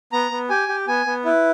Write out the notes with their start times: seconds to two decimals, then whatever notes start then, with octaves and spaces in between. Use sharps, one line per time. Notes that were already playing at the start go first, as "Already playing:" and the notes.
0.12 B3 A#5
0.31 B3
0.50 G4 G#5
0.68 G4
0.87 B3 G#5
1.06 B3
1.25 E4 B4